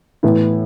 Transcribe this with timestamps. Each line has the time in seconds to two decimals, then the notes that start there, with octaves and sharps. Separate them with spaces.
0.23 A2 E3 B3 E4